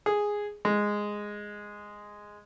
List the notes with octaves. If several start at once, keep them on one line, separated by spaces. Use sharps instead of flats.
G#4
G#3